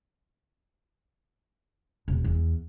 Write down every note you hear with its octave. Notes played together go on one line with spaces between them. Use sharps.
E1
E2